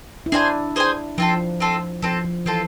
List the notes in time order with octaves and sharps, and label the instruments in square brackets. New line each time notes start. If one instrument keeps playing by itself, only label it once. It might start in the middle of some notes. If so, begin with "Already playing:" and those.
[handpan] E4
[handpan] D4 [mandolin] G#4 C5 G#5
[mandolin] G#4 C5 G#5
[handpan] F3 [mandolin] C4 F4 A4
[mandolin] C4 F4 A4
[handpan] F3 [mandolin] C4 F4 A4
[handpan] F3
[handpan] E3 [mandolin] C4 F4 A4